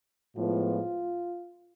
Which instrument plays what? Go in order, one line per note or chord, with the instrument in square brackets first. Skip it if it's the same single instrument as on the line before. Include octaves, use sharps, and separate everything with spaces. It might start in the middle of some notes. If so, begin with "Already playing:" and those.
[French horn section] A2 F3 G#3 B3 F4